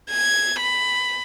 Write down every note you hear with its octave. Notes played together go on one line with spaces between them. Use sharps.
G#6
B5